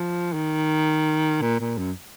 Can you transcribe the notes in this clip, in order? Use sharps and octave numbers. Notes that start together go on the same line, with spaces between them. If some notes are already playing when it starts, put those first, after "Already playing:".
Already playing: F3
D#3
A#2
A#2
F#2